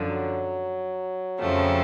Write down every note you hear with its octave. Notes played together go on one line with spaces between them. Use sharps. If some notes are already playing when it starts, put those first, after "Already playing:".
Already playing: F#2 D3 F3
F#3
F2 C#3 F3 A3 C4